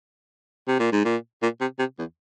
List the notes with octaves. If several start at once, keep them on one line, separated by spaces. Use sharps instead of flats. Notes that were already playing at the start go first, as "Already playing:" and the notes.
C3
A#2
G#2
A#2
A#2
C3
C3
E2